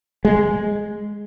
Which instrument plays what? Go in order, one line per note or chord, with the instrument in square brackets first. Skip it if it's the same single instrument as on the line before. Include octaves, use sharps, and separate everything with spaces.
[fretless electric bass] G#3